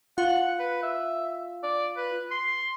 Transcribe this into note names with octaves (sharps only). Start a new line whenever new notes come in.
F4 F#5
B4
E5
D5
B4
C6